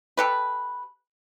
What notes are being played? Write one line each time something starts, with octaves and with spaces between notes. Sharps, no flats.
G4 A4 B4